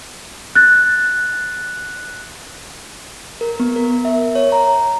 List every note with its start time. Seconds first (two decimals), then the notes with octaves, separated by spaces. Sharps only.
0.55 F#6 A6
3.41 A#4
3.60 B3
3.76 A#4
4.05 E5
4.35 C#5
4.52 A#5